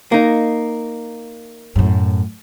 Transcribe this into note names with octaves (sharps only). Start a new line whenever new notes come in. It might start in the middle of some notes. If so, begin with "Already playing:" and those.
A#3 D#4
F#2 A2